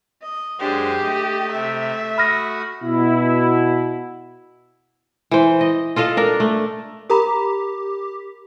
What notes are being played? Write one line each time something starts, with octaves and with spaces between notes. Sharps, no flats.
D#5
F#2 G#3 D4 G4 G#4 C5
A3 D#5
C3 E5
F#4 B5 D#6 F6 A#6
B2 E4
E3 C5
D#5
F4 A4 D#5 F5
D4 A#4
A3
G4 A#4 A#5 B5